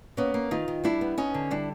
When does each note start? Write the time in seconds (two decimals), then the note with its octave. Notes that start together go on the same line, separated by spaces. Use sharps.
0.17 A#3 B3 C#4
0.34 A#3
0.51 D#3 D#4 F4
0.68 D#3
0.84 G3 D4 E4
1.01 B3
1.18 B3 C#4 D#4
1.34 D3
1.51 G3 D4 E4